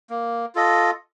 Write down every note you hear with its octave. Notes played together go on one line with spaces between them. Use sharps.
A#3
F4 A4 D#5